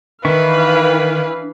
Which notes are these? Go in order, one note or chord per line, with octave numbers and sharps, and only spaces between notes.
D#3 E3 D4 B4 E5 F5 C#6